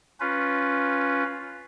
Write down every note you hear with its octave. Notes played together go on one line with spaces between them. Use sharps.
C#4 F4 B4